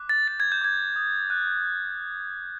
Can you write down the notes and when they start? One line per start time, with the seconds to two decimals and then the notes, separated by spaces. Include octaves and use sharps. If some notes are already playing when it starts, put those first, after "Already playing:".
Already playing: D6 F#6
0.09 A6
0.27 G6 A6
0.40 G#6
0.52 G6
0.61 D6 G#6
0.96 D#6
1.30 F#6